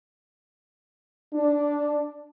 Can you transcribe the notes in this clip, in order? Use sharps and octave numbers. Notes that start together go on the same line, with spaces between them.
D4